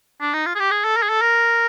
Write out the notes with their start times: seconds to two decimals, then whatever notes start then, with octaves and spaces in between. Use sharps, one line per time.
0.21 D4
0.33 D#4
0.46 F4
0.55 G#4
0.59 G4
0.71 G#4
0.84 A4
0.96 A#4
1.02 G#4
1.09 A4
1.21 A#4